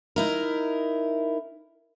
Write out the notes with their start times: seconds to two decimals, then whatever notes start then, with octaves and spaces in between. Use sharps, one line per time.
0.16 D#4 E4 A#4